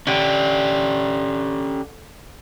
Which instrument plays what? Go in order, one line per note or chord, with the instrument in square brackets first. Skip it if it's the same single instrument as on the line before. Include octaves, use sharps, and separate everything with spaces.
[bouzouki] D3 [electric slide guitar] C#4 G4